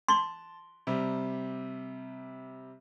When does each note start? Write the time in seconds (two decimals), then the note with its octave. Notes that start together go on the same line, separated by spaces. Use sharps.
0.08 A5 C6 G7
0.87 C3 G3